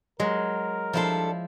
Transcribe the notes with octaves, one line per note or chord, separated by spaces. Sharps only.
F#3 G#3 A#4
F3 G3 D4 E4 A4 C6